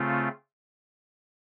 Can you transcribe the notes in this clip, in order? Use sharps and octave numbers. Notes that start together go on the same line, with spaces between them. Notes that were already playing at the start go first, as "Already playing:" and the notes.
Already playing: C#3 A3 C4 F4